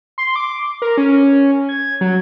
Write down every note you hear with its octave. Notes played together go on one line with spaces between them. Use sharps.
C6
D6
A#4
C#4
G#6
F#3